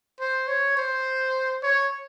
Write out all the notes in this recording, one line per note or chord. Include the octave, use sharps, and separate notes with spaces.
C5
C#5
C5
C#5